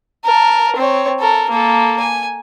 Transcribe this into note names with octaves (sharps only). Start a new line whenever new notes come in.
A#4 A5
C4 C#5
A4 A#4
A#3 A4
G#5